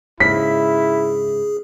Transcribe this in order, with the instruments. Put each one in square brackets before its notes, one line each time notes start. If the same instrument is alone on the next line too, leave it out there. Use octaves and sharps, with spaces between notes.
[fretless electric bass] G#2 C#3 [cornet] E4 [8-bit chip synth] G#4 [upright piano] B6